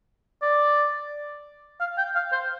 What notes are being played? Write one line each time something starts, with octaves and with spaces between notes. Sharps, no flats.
D5
F5
G5
F5
C5